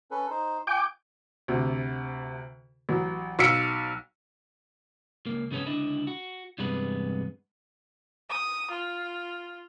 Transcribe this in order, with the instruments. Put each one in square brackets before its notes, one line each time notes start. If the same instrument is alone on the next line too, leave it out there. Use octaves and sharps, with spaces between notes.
[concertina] C#4 A4 B4
D#4 C5
[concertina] F4 G#5 [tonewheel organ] G5 D6
[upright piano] D2 C3
A1 F#3
B1 F5 E6 B6 C#7 D7
[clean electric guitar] C#2 A#3
G#2 C#3 G#3 B3 C#4 A4
C#2 D3 D4 E4 D#5
F#4
E2 G2 C3 G#3 B3 B4
[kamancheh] D#6
F4